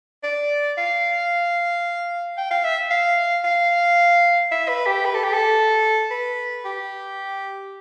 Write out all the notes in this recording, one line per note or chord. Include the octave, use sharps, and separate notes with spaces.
D5
F5
G5
F5
E5
F5
F5
E5
B4
G4
B4
A4
G4
A4
B4
G4